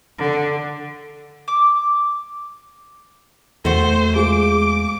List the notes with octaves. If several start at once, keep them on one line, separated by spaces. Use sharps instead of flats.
D3
D6
E2 A3 F#4 C5
G#3 F4 G#4 D6